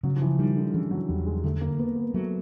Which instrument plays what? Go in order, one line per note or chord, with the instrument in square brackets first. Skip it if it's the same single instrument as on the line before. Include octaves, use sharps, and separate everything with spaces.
[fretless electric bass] C#3 [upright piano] F#3
[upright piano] F3
E3
[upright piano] D#3 [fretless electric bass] G3
[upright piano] D3
[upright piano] C#3 [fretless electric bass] E3
[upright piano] F#3
[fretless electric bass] E2 [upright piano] G3
[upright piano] G#3
[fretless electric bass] D3 [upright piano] A3
[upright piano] A#3
[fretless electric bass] A#3 [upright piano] B3
[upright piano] B3
[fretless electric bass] F#3 [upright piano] A3